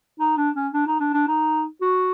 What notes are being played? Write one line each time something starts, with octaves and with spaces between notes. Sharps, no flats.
D#4
D4
C#4
D4
D#4
D4
D4
D#4
F#4